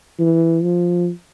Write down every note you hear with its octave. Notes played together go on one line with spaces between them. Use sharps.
E3
F3